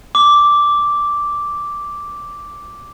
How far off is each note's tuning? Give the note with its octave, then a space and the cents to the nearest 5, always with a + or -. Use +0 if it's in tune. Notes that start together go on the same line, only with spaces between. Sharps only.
D6 -5